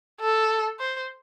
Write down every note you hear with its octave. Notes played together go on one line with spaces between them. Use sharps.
A4
C5